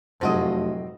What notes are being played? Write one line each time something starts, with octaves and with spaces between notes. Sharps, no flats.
F1 F#2 A2 G#3 C4 F#4 C5 D#5